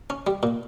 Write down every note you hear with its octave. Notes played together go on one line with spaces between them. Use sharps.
C#4
G3
A#2